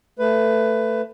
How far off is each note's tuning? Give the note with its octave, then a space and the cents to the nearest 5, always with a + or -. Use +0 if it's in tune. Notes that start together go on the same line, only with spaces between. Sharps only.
A3 +20 B4 +15